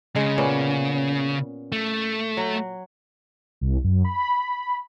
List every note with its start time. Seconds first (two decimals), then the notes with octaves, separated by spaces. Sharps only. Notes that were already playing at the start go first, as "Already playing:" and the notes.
0.16 C#3 G#3
0.38 A#2 B3 C#4
1.72 A3
2.37 F#3
3.61 C2
3.84 F#2
4.04 B5